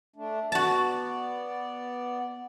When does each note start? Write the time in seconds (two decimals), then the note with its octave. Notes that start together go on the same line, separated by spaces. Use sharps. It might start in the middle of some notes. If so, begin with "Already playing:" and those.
0.16 A3 D4
0.52 B3 F#4 D5 A5